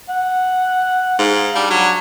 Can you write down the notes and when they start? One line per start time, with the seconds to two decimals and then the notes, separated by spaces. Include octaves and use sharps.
0.09 F#5
1.19 G#2 F5
1.55 G3 D4
1.70 F#3